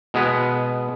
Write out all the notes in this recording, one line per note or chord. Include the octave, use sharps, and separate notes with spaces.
B2 G#3 B3